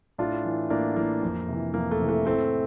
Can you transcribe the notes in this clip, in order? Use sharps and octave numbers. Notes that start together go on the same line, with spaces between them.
A2 D4 F4
E3
A2 A#3 D4
E3 A#3
F2
C3 E3
F2 A#3
A3
C3 E3
A3
A2 A3 C4